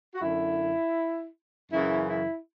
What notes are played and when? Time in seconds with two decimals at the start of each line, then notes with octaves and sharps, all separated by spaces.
0.15 F#4
0.21 F#2 D3 E4
1.72 F#2 C#3 E3 E4
2.09 E4